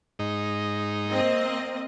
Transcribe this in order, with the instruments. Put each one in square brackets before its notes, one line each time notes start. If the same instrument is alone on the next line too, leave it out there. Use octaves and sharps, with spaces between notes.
[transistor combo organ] G#2 D#4
[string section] A#3 C4 D#5